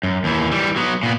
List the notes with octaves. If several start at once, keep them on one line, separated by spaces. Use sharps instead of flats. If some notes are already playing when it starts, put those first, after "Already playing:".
F#2
D#2 E3
E3 G3
F#3 B3
A#2 B3